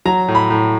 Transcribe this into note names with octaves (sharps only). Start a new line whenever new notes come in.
F#3 A#5
A2
B5
A2